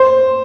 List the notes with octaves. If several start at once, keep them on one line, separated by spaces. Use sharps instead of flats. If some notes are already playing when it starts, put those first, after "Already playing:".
Already playing: C5